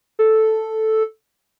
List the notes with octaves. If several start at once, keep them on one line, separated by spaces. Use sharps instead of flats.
A4